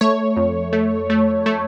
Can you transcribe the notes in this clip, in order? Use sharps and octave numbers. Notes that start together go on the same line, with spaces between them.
A3 C#5
F2
A3
A3
A3